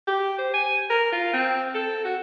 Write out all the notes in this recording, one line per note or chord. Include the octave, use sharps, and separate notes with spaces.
G4
C5
G#5
A#4
F4
C4
A4
F#4